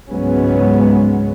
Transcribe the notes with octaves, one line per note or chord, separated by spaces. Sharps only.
C#2 G#2 F#3 G#3 B3 C#4